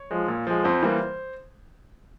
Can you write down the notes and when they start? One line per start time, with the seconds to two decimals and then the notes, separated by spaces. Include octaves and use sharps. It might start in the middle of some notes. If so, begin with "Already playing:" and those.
Already playing: C#5
0.11 F3 G#3
0.28 A#2
0.47 F3 G#3
0.64 F2 C5
0.83 E3 G3 A#3